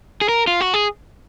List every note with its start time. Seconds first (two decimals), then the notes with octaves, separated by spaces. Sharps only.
0.21 G#4
0.29 A#4
0.47 F4
0.61 F#4
0.74 G#4